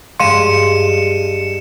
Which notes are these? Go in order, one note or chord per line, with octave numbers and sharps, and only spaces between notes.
G2 G#3 F5 C6 C#7 D#7 E7